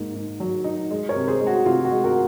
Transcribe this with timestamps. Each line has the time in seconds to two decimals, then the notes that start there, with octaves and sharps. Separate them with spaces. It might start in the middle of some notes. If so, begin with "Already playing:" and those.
Already playing: G#2 A#3
0.14 G#2
0.40 F#3
0.64 D#4
0.91 G#3
1.09 A#4 C#5
1.15 C3
1.28 G#4 C5
1.41 G#3
1.47 F#4
1.65 C3 F4
1.85 F#4
1.91 G#3
2.04 F#4 A#4